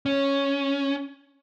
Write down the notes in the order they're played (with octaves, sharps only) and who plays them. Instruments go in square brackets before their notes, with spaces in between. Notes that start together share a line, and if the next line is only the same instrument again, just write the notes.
[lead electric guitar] C#4